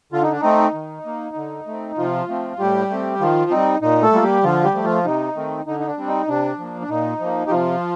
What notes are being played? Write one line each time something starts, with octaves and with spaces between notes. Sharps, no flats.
D3 F4
D#4
D4
A3 C4 D#4
D#3
A#3
D3
A3 C4
C3 F3 F4
F3 A3 C4
A2 G3 G4
A3 C4
D#3 F3 F4
G3 C4 D#4
A#2 D#4
A3 A4
G3 A#3 F4
G3 G4
D3 F3 F4
G3 G4
F3 A3
F3 F4
C3 D#4
D#3 A3 C4
D3 D#4
D#4
D4
G3 C4
D#4
C3 D4
F3 A#3
D4
A#2 D#4
F3 A#3
G4
C3 F3 F4